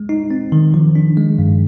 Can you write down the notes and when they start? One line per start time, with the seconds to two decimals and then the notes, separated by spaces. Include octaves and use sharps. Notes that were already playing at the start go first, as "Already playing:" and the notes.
Already playing: G#3
0.09 D#4
0.31 C4
0.52 D#3
0.74 F3
0.95 D4
1.17 G#3
1.39 G2